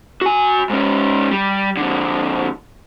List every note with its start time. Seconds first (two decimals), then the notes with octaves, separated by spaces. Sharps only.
0.21 F#4 G#5
0.70 G#2 C#4
1.31 G3
1.77 F2 D3